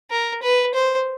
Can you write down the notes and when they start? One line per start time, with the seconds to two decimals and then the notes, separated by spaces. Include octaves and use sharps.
0.11 A#4
0.43 B4
0.74 C5